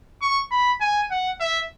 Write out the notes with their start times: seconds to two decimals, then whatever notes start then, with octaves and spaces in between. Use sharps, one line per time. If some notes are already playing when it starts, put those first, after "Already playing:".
0.21 C#6
0.51 B5
0.81 G#5
1.10 F#5
1.40 E5